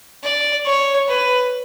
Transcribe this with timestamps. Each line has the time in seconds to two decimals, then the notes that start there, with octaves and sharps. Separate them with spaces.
0.24 D5
0.66 C#5
1.08 B4